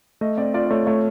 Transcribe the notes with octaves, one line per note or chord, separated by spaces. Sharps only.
A3 D#5
C4 D5
F4 D5
D5
A3 C#5
A3 C#5